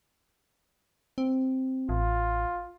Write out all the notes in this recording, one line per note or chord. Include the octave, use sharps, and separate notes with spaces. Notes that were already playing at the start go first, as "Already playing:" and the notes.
C4
A1 F4